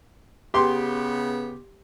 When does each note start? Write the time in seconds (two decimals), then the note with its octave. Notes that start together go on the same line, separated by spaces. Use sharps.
0.54 C#3 B3 G4 C6